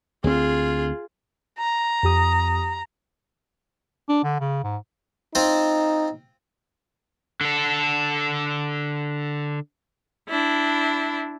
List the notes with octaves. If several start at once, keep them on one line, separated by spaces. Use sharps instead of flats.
D2 C4 F4 G#4
A#5
F2 G4 D#6
D4
D3
C#3
G#2
C4 D#4 F4 C5
D3 A4
D4 E4